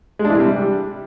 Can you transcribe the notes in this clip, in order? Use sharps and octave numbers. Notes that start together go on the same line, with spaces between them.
G#3
D4
E3
C3
G3